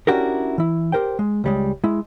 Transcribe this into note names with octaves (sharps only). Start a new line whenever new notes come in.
C#4 D4 E4 F#4 G4 A#4
E3 E4
G4 A#4 C5 G5
G#3
C#2 G3 G#3
G#3 E4